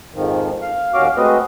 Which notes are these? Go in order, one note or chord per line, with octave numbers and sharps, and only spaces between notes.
F2 G#2 D#3 F3
F5
D#2 C#4 F#4 F5 D6
G#3 A3 C4 F#4 B4 D#5